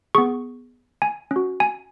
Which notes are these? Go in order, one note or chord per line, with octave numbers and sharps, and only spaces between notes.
B3 G#4 C#6
G#5
C#4 F#4
G#5